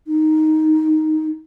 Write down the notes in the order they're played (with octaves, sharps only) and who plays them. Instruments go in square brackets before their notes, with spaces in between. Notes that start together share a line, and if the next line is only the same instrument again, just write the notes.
[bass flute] D#4